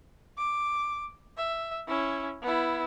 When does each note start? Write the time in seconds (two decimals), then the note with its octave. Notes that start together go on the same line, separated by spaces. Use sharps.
0.38 D6
1.38 E5
1.88 C#4 E4
2.42 B3 E4